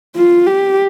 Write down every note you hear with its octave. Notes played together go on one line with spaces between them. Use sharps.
F4
G4